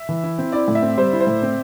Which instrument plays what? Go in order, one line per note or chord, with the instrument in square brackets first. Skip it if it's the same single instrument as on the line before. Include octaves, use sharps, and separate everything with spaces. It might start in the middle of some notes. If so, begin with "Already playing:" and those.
Already playing: [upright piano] E5
[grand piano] E3
E4
C4
[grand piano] E4 [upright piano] D5
[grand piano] A2
[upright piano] E5
[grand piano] C4
[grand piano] G3 [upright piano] C5
[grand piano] E4
[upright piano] C5
[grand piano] A2
C4